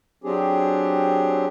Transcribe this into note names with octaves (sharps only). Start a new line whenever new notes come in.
F#3 C4 D4 G4 G#4